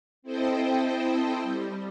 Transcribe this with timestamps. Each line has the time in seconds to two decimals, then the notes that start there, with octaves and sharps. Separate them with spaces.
0.22 C4 E4 A4 C5 D#5 G5
1.41 G3